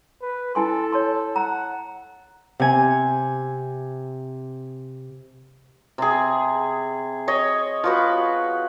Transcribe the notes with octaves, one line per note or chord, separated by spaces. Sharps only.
B4
E4 A4 G#5 C6
C#5 A5 C6
F#5 A#5
C3 G#5
C3 G#4
C#5 D#5
F3 F#4 B4